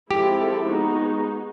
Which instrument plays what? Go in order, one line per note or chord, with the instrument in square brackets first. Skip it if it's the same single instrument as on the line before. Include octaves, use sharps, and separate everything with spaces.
[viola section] F3 G#3 C4 E4 A4 [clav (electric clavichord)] G4
[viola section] G#3 B3 D#4 F#4